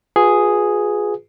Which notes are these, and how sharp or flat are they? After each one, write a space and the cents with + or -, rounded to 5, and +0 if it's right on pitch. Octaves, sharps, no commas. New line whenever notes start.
F4 +40 G#4 +0 B4 +0